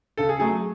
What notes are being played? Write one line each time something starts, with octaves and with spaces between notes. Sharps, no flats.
C#3 A4
G#4
F#3 A3 G#4